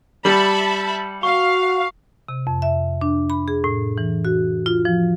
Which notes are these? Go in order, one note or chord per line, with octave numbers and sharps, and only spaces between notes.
G3 E5 A5 B5 C#7 F#7
F#4 F5 C#6
C3
F2
E5
D4
B5
G#4
A2
E3
F#4
F4
F3